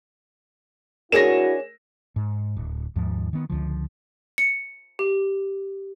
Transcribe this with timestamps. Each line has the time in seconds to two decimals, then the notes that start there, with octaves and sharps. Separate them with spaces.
1.12 D4 E4 F#4 G#4 A#4 C#5 A#6 E7
2.16 G#2
2.57 D1
2.96 D#2 G#2 F3
3.33 D#3 B3
3.50 C#2 D3 F3
4.38 C#7
4.99 G4